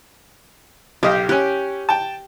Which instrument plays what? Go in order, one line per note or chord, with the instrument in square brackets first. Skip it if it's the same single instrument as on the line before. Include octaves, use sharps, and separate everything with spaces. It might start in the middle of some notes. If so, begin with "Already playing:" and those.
[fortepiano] B1 D#5 F5 [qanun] G4
[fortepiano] C#4 F#6 [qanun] G4
[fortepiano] G5 A5